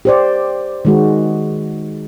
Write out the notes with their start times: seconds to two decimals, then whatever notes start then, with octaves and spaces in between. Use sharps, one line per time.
0.05 G4 C5 D5
0.85 D#3 G#3 F#4